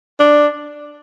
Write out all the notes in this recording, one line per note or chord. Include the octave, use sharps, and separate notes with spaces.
D4